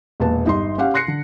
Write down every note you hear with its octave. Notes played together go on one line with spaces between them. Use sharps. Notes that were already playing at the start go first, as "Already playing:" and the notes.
E1 A#2 B3 A5
G1 D#4 C6
C#4 G4 F5 F#5
C6 F#6 A#6 C7 C#7
D3